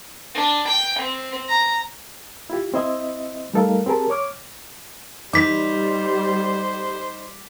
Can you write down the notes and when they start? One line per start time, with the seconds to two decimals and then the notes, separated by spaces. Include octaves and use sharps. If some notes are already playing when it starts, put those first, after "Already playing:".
0.35 D4
0.68 G5
1.00 C4
1.49 A#5
2.50 E4 F4 G4
2.74 C4 E4 C5 D#5 E5
3.54 G3 A3 D#4 A4 A#4 F5
3.86 C4 G4 G#4 A#4 A5
4.10 C#5 D6 F6
5.33 G3 D#4 C5 D6 B6